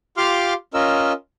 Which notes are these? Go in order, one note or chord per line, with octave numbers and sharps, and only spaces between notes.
F4 G4 F5 C6 D6 F6
C#4 F4 A#4 D#5 E6